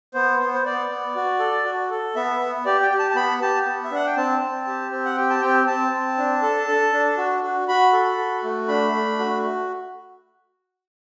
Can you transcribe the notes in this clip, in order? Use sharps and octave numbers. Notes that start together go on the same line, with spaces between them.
B3 C5
B3
C5
B3 D5
B3
F#4
A4
F#4
A4
B3 E5
B3
G4 D5
G5
G4
A5
A5
B3 B5
G4 A5
B3
E5
D4 F#5
G5
C4 A5
C4
G4
C4
F#5
G4 G5
A5
C4 G5
C4 A5
C4
D4
A4
A4
D4
F#4
F#4
F#4 B5
A4
F#4
A3
D4 B5
A3
F#4